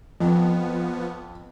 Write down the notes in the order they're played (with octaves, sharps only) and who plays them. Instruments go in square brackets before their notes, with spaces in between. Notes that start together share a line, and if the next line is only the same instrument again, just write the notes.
[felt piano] F2 [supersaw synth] F3 B3